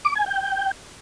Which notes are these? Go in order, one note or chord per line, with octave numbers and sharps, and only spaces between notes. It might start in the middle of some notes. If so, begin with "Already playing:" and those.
D6
G#5
G5